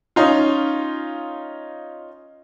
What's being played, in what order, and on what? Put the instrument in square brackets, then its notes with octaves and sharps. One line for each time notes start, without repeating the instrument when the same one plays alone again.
[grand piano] C#4 D#4 F4